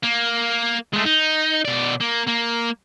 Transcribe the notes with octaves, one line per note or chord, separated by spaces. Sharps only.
A#3
G#3 A3
D#4
B2 D5
A#3
A#3